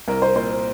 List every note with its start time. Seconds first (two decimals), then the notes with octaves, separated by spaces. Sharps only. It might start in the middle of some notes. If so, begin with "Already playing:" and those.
0.08 C2 A#4
0.22 C5
0.36 A#2 C5